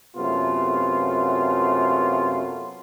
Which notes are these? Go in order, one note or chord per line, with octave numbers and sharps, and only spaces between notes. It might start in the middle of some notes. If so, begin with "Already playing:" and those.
F#2 C3 A3 B3 F4